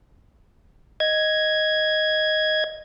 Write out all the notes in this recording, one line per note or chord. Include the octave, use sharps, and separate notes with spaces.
D#5 G#6